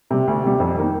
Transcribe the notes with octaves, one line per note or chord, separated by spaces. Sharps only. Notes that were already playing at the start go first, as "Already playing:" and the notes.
C3 G3
D2
C3 G3
F2
D#3 A#3 D#4